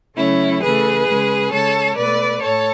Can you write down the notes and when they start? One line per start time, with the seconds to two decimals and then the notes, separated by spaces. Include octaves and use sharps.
0.16 C#3 F#3 A3 C#4 E4
0.61 C#3 E3 A3 G#4 B4
1.06 C#3 G#3
1.52 C#3 G#3 A4 C#5
1.96 B2 A3 B4 D5
2.41 A2 A4 C#5